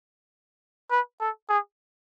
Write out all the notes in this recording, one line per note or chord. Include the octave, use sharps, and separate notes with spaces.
B4
A4
G#4